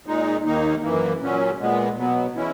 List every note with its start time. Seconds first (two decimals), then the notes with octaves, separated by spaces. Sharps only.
0.06 A#2 G#3 D#4
0.45 D#2 D#3 A#3 D#4
0.82 F#2 E3 A#3
1.20 A#2 F#3 C#4
1.58 A#2 G#3 B3
1.97 B2 F#3 B3
2.35 E3 G#3 C#4 E4